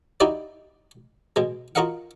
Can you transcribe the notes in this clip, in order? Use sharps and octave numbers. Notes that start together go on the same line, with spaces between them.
D#4 E4 F#4 G4 D5 D#5
B2 G#3
F4 F#4 A#4 D#5 F5 F#5